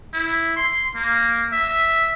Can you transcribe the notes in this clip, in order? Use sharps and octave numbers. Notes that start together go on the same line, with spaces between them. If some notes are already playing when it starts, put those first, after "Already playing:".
E4
C6
A#3
E5